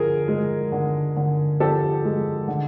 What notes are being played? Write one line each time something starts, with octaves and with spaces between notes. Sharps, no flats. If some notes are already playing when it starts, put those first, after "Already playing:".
Already playing: D3 F3 G#4 A#4
G#3
D3
D3
F3 G4 A4
G#3
D3